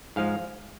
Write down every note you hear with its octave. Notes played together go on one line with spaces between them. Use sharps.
G#2 F3 G#3 F5